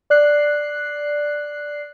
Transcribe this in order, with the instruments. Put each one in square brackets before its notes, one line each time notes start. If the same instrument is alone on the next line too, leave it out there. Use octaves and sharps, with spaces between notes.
[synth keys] D5 F#6 C7